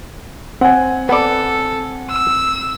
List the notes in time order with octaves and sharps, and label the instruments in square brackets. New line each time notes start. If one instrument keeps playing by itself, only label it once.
[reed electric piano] C4 [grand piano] F#5 G#5
[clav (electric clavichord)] B3 D5 [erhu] A4
[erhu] E6